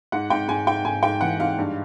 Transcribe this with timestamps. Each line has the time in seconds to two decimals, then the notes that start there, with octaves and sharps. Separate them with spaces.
0.12 G#2 F#5
0.30 G#2 G5
0.48 G#2 G#5
0.67 G#2 G5
0.85 G#2 G#5
1.03 G#2 G5
1.21 E3 F#5
1.40 G#2 F5
1.58 G2